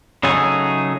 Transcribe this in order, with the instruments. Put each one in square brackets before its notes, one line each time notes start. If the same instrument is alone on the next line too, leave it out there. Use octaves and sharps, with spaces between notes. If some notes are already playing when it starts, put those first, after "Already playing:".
[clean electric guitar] C#3 F#3 A3 D#4 G#4